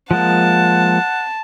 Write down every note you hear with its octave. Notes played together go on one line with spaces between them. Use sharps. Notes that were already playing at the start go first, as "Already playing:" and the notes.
F3 G#3 A#3 F#5 A5